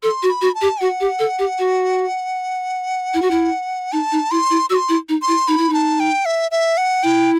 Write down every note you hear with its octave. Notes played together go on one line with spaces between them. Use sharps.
A4 C6
F#4
B5
F#4
A5
G4
F#4 F#5
G4
A4
G4
F#4
E4
F#4
E4
D#4 A5
D#4
E4 C6
E4
F#4 E6
C6
E4
D#4
C6
E4
D#4 B5
E4
D#4 A5
G5
E5
E5
F#5
E4 G5